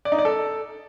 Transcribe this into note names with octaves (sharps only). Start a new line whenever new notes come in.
D5
D#4
D5
A4